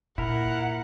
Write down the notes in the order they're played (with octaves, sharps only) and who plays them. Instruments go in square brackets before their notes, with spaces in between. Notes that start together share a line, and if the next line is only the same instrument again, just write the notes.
[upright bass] A#2 [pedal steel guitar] E4 A#4 [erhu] F#5